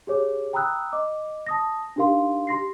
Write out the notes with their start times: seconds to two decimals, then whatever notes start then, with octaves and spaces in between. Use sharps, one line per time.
0.07 G4 G#4 C#5 D6
0.53 G5 A#5 B5 D#6 E6 F#6
0.92 D#5 D6
1.46 A5 D#6 A#6
1.96 D4 D#4 G4 A#4 F5 C6
2.47 G4 C6 A#6 C7